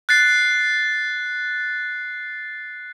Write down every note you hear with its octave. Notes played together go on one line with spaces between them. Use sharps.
F#6 A6 C7